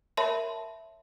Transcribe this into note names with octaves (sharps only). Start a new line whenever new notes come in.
A#4 C#5 E5 A5 B5 C6